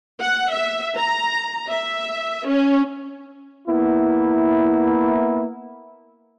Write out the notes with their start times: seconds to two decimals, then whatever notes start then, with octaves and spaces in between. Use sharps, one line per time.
0.21 F#5
0.52 E5
0.97 A#5
1.71 E5
2.48 C#4
3.67 A#3 B3 E4